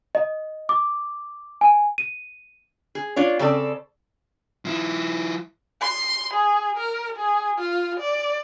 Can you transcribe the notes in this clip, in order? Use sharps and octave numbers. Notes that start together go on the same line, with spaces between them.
D#5
D6
G#5
D#7
G#4
D4 F4 C#5
C#3 C4 A4 D5
F3 E4
C6
G#4
A#4
G#4
F4
D5